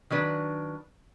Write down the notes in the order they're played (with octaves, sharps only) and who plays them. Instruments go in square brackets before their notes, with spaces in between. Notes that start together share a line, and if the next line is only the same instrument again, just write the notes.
[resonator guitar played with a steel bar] D#3 F#3 D4 B4